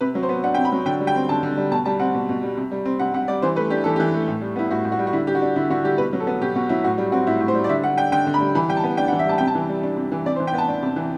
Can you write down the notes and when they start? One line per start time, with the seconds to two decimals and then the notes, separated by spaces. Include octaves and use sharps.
0.01 C3 B4
0.15 F#3
0.23 C5
0.29 B3
0.43 D4 F#5
0.54 G5
0.58 C3
0.65 B5
0.72 F#3
0.86 D3 G5
1.01 G3
1.07 G5
1.15 C4
1.29 D3 A5
1.43 D3
1.57 G3
1.71 B2 A5
1.85 G3 A5
2.00 C4 F#5
2.15 B2
2.29 B2
2.43 G3
2.57 C3
2.72 G3
2.85 C4
2.99 C3 F#5
3.14 C3 F#5
3.28 G3 D5
3.42 E3 C5
3.56 A3 B4
3.70 D4 G4
3.84 E3 A4
3.96 E3 G4
4.14 A3
4.27 A2
4.42 G3
4.56 B3 E4
4.71 A2 F#4
4.85 A2
4.92 F#4
4.99 G3
5.07 F#4
5.13 D3 E4
5.27 G3 G4
5.35 F#4
5.42 D4
5.56 D3 E4
5.70 D3 F#4
5.84 G3 G4
5.98 B2 B4
6.13 F#3
6.20 A4
6.27 B3
6.41 B2 G4
6.56 B2 F#4
6.69 F#3 E4
6.84 A2 F#4
6.98 G3
7.12 C4 F#4
7.27 A2 E4
7.40 A2
7.48 C5
7.55 G3
7.64 D5
7.69 D3 E5
7.83 G3 F#5
7.98 D4 G5
8.12 D3 G5
8.27 D3
8.34 B5
8.41 G3
8.55 E3 B5
8.69 G3 G5
8.77 A5
8.84 B3
8.97 D4 G5
9.08 F#5
9.12 E3
9.19 E5
9.26 G3 A5
9.38 C3 G5
9.47 A5
9.55 E3
9.69 G3
9.83 D4
9.97 C3
10.12 E3
10.26 C3 D5
10.36 C5
10.40 E3
10.47 G5
10.54 B3 A5
10.68 D4
10.82 C3
10.96 E3